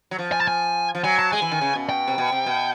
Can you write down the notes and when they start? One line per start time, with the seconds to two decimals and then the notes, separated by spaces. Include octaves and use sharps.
0.11 F#3
0.18 F3
0.32 G#5
0.40 A5
0.48 G#5
0.95 F3
1.04 F#3 G#5
1.19 A5
1.32 G#3 G#5
1.42 E3
1.51 D#3
1.61 C#3
1.75 B2
1.89 G5
2.08 C3
2.18 B2
2.32 C3
2.46 B2